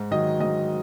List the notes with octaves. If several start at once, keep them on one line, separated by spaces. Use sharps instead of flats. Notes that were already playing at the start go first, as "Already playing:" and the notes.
Already playing: G#2
D#3 F#3 D#5
G#2 D#5